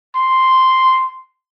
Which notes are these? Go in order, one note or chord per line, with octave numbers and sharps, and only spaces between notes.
C6